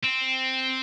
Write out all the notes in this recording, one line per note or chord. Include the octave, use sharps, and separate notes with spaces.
C4